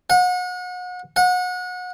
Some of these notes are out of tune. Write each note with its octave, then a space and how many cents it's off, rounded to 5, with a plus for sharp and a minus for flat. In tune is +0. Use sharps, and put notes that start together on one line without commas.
F#5 -35
F#5 -30